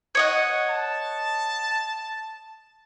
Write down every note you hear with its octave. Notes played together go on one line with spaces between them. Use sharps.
C#5 D#5 F#5
A5